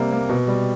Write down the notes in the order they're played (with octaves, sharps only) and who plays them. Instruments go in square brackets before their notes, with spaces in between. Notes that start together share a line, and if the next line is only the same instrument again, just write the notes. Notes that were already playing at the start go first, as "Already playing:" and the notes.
Already playing: [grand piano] C3 G3 A#3
A#3
B2
G3